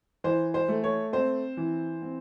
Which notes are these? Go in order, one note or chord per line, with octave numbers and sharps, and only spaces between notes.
E3 C5
C5
A3
C#5
C4 C5
E3
C4